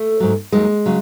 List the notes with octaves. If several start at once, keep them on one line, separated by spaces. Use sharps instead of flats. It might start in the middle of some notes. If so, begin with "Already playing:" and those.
Already playing: A3
G#2 F#3
D#2 D#3 F#3 G#3
C#3 F#3